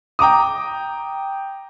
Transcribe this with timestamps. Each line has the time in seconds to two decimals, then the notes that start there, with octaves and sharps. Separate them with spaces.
0.19 G5 A#5 D6 D#6